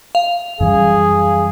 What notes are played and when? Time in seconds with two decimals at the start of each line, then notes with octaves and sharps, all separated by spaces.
0.15 F5
0.60 F#2 E3 G3 G#4